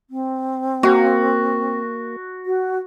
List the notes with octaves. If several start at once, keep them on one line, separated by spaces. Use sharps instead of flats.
C4
A#3 F#4
F#4